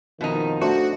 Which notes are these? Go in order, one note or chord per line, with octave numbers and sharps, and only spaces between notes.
F2 B2 D#3 F3 D#4
A3 D4 F#4 C5